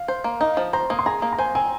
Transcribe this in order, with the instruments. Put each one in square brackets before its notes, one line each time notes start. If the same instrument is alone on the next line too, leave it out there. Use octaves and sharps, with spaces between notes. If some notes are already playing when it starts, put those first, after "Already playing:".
Already playing: [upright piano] F5
[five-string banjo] C5
A#3
[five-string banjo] D#4 [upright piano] F5
[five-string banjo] F3
[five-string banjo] C5 [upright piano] A#5
[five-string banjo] A#3 [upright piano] D#6
[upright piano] C6
[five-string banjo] G#4 [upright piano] A#5
[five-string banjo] A#3
[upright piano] A#5
[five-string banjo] C5 [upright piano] G#5
[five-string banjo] C4 [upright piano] G#5